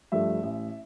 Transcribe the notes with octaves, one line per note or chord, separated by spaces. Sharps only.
G2 F3 A3 E5
A1